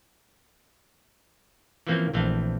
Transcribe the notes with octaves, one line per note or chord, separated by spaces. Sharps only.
E3 F3 A#3 C4 C#4
A#1 E3 A3 C4 F5